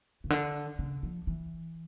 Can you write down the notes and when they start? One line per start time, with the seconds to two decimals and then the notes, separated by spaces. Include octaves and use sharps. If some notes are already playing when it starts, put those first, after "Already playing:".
0.24 C#3
0.30 D3
0.79 C#3
1.03 F3
1.27 E3